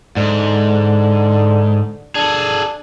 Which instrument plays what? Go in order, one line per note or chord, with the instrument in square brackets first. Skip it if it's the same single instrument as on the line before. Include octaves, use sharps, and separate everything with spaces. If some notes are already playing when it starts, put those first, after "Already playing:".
[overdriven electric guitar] G#2 [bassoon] D3
[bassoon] D4 [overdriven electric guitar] G#4 A4